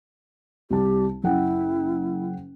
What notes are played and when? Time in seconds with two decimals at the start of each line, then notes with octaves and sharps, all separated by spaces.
0.70 C2 G3 G4 A5
1.24 F#1 E4 F#5 G5